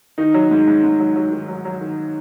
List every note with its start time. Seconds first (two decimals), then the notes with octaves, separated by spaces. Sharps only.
0.18 D#3 D#4
0.34 F#3
0.51 G#2
0.68 G#2
0.84 G#2
1.00 F#3
1.16 F#3
1.32 D#3
1.48 F#3
1.65 F#3
1.81 D#3